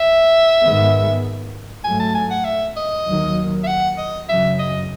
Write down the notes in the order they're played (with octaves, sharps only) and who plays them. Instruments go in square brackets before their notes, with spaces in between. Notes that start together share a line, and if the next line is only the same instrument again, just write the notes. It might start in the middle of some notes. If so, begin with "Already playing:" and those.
Already playing: [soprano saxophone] E5
[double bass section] G#2 D#3 G#3 B3
[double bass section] G#2 F#3 A3 [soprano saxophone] G#5
[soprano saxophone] A5
G#5
F#5
E5
D#5
[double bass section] D#2 D#3 F#3
[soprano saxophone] E5
F#5
D#5
[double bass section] F#2 C#3 F#3 [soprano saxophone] E5
[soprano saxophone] D#5